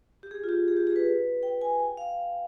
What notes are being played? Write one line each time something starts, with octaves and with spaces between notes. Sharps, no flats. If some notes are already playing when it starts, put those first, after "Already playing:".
G4
G#4
F4
G4
G#4
G4
G#4
B4
G5
G#5
G5
F5